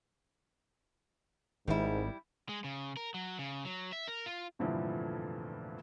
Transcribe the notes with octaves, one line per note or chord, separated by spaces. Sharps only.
G#1 G#2 D#3 G3 E4
G#3
C#3
A#4
F#3
C#3
F#3
E5
A#4
F4
F1 G2 A#2 D3 E3 F3